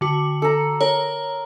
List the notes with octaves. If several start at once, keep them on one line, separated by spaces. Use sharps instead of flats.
D3 F#4
A4 A#5
A#4 C#5